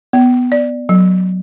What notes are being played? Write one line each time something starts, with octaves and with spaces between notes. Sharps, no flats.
B3
D5
F#3